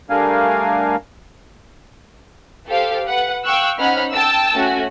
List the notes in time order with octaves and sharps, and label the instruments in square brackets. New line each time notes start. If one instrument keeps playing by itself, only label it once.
[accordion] G3 A3 D4 A#4 F5 G#5
[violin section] G4 A4 C5 F5
B4 F#5
F5 G5 C#6 E6 F#6
C#4 D#4 C5 F#5 B5 F6
G5 A5 E6
A3 C#4 F#4